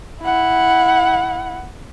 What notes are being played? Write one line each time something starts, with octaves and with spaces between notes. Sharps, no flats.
E4 F#5